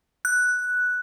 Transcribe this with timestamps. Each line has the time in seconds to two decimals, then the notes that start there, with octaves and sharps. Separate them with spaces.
0.25 F#6